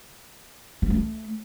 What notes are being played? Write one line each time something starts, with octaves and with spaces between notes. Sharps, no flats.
B3
A3